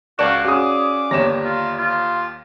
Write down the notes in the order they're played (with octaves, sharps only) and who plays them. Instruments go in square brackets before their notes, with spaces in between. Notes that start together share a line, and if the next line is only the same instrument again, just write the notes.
[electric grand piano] C#2 A5 E7 [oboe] F#4 [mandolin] D5 F5
[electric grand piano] C#4 G#4 [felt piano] F#4 D#6 [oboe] D6
[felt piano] G1 C#5 E7 [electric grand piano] D#2 G4 A#6
[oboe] F4
F4